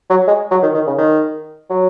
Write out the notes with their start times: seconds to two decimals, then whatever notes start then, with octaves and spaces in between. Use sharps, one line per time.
0.10 F#3
0.27 G#3
0.51 F#3
0.63 D#3
0.75 D#3
0.87 C#3
0.98 D#3
1.70 F#3